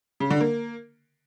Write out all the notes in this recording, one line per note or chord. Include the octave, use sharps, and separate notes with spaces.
C#3
D3
A#3